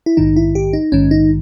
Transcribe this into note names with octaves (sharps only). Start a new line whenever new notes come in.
E4
A#1 G#2 D#3 D#4
E4
G4
D#4
A#1 G#2 D#3 C#4
D#4